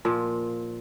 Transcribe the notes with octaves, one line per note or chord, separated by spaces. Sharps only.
A#2 F3